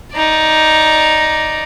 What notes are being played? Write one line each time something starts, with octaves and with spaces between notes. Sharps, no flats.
D#4 D5